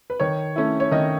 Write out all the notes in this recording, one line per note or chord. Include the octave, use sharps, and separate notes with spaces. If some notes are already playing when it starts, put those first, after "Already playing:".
B4
D#3 C#5
A3 C#4 E4
C#5
D#3 D#5